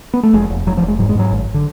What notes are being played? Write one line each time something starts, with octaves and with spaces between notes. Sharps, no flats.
B3
A3
F1 G#3
F1
F1 F#3
F3
F1
G#3
G#2 F#3
G#3
G#2 F#3
G#1
D3